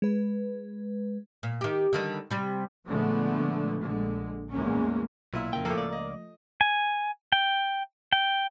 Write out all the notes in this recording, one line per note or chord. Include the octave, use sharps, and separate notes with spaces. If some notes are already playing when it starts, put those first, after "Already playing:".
G#3 B4
A#2
D#3 G4
D3 D#3 G3
C3 G3
A#2 D3 F3 G#3 A3 B3
A#1 D3 G#3
E2 A2 G#3 A#3 C#4
B1 A#2 E4
F2 C#3 A#3 A#4 G5
A2 F3 A3 A#3 A4
C#2 D5
D#5
G#5
G5
G5